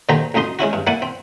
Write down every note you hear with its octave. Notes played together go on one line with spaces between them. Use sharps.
A#2 D3 D#3 G4 C5 A#5
A1 D2 D#4 D#5 C6
G#3 C#4 E4 F#4
G2
A#3 E4 D5 F#5 G#5
C4